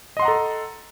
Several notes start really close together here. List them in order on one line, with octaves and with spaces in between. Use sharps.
D#5 C6 F#5 A#5 A4